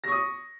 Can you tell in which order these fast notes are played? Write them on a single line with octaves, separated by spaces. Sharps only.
A#6 C#6 D#6